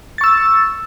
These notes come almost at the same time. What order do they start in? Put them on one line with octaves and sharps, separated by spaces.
A6 C#6 E6